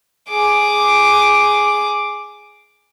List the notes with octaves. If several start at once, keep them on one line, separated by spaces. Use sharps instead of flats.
G#4 D6